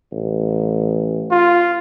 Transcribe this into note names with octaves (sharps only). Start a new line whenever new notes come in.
A1
F4